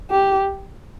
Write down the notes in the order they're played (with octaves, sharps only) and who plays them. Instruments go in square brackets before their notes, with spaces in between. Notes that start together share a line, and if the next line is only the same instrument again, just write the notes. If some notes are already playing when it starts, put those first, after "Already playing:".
[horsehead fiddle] G4